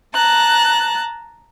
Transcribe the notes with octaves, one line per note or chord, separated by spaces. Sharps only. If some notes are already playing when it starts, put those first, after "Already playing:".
A5 A#5 F#6